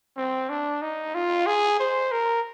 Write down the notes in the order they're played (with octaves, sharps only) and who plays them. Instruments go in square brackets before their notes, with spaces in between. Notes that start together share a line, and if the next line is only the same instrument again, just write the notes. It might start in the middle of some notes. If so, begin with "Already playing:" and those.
[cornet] C4
D4
D#4
F4
G#4
C5
A#4